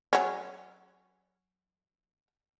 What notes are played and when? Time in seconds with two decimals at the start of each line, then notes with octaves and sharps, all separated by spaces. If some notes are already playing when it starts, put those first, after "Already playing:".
0.13 F#3 C#4